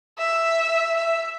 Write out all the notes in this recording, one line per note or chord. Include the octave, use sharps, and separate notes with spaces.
E5
E5